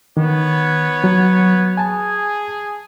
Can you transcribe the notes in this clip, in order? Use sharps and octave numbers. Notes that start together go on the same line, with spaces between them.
D#3 B3 C#5
F#3
G#4 G#5 A5